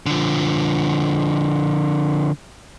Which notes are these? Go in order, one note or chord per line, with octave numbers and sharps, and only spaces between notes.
D3 F3